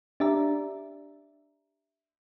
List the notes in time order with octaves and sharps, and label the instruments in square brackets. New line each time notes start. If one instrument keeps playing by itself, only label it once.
[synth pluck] D4 G4 D5 E5 A#5